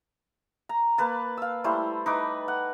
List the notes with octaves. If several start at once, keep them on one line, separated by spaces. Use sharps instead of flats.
A#5
A#3 B4 A5
F5 E6
G3 A3 E4 C5
D#4 B4 D6
F#5